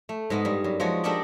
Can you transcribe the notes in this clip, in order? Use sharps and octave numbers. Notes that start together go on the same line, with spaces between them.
A3
G#2 G#3 B3
G2 G3
F#2
F3 G#3 F#4 C#5
D4 G4 A4 A#4 D5 D#5